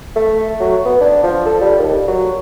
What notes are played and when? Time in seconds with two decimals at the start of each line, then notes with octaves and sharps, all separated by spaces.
0.16 A3
0.60 F#3
0.86 B3
1.01 D4
1.24 F3
1.46 A4
1.61 G3
1.79 D#2
2.07 F#3